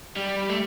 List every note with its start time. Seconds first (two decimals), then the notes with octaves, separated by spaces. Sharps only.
0.16 G3
0.49 A3